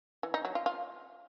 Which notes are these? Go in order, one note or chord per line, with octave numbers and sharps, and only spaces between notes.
E3
D#4
F#3
F4
F4